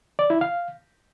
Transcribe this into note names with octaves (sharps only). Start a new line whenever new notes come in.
D5
E4
F5